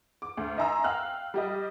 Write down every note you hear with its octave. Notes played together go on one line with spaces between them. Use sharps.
D6
D2
D#5 E5 G#5 A#5 C6 E6
F5 G5 F6 F#6
G3 G4 D#5